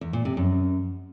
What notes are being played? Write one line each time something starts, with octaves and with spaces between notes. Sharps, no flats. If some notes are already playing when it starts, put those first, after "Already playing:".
E2
A#2
C3
F#2